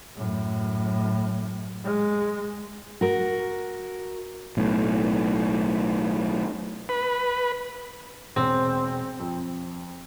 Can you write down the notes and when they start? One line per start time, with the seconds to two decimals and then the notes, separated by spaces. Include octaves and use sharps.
0.16 F#2 A2
1.85 G#3
3.01 F#4 A#4
4.57 B1 A2
6.89 B4
8.36 E1 C4
9.20 F2